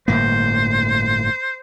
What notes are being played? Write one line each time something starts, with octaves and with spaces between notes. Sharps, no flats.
G1 A2 A#3 C5